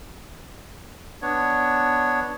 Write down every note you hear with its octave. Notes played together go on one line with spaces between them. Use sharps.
B3 D4 C#5